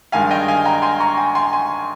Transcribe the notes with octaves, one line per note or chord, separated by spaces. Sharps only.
G2 D#3 G#3 F5 G#5
D#5 G5
F5 G#5
G5 A#5
G#5 C6
A#5 C#6
G#5 C6
G#5 C6
G#5 C6